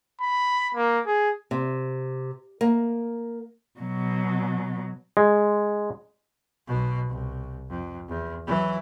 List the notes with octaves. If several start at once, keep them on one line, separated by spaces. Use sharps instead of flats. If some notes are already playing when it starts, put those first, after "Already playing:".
B5
A#3
G#4
C3
A#3
B2 F#3
G#3
B1 B2
C2
F2
E2
E3 F#3